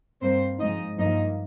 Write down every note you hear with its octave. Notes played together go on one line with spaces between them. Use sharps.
G2 G3 A#3 C4 C5
G#2 F3 G#3 D#4 D#5
G2 F3 A#3 D#4 D#5